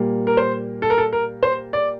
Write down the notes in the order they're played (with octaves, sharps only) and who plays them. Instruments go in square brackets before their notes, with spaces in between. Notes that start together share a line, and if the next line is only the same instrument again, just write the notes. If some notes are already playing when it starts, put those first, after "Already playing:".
Already playing: [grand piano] A#2 G3 A#3
[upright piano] A#4
C5
A4
A#4
A4
A#4
C5
D5